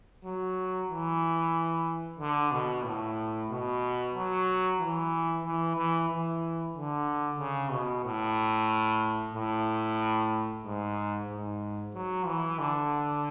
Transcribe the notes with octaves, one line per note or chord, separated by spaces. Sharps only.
F#3
E3
D3
B2
A2
B2
F#3
E3
E3
E3
E3
D3
C#3
B2
A2
A2
G#2
G#2
F#3
E3
D3